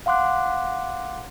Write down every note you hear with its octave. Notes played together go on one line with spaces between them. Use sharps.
F5 F#5 C6 D6 F#6